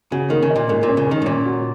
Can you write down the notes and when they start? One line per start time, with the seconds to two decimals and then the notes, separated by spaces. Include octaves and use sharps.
0.11 C#3 F#4
0.30 D#3 A#3
0.43 C#3
0.50 D#5
0.56 A#2
0.69 G#2 A#3
0.83 A#2
0.88 C#4
0.97 C#3
1.07 D#3 C#4
1.22 G#2
1.26 A#2 C#4
1.46 F#4